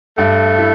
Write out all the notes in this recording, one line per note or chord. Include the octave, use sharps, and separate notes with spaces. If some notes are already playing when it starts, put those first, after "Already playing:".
G2 A3
E4